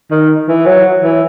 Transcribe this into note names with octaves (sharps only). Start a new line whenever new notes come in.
D#3
E3
F#3
E3